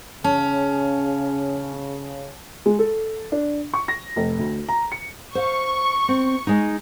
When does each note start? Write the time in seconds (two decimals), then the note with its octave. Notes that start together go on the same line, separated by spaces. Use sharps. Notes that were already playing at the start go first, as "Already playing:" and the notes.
0.24 C#3 C#4 A5
2.66 G#3
2.79 A4
3.32 D4
3.74 C#6
3.88 A#6
4.16 F1
4.39 D2
4.69 A#5
4.92 C#7
5.35 C5 F5 C#6
6.09 C4
6.47 G#3 D#4